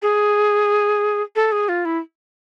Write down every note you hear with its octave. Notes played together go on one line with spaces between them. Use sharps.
G#4
A4
G#4
F4
E4